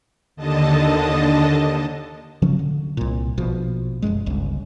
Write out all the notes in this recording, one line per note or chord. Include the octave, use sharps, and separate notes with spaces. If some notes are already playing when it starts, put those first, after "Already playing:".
D#2 D3 D#5 A5
C#3 F3 F#3 C#4
D3
C2 A#2
A#1 B2 F3
F1 C#2 F#2 G#3
G1 C#2